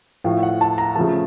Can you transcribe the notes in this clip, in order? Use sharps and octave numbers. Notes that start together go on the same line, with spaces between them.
A2 F3 A3 F5
F#5
A5
A#5
C#3 F3 A3 A5